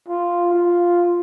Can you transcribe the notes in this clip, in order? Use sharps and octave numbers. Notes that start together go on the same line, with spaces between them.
F4
F4